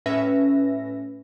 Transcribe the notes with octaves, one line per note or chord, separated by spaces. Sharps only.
A2 C#4 B4 E5 A#6